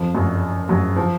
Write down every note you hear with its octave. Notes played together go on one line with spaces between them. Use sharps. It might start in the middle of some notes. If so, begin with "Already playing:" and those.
Already playing: F2 F3
F#2 F#3
F#2 F#3
F3